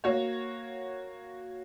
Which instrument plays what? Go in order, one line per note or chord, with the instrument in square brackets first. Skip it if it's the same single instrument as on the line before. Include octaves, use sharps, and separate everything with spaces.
[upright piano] A#3 F#4 C#5